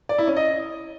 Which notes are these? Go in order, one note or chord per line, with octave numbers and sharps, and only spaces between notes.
D5
E4
C#4
D#5